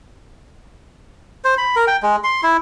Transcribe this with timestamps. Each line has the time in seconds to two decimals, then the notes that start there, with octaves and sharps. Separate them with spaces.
1.44 C5
1.58 B5
1.76 A#4
1.87 G5
2.03 G#3
2.24 C6
2.43 E4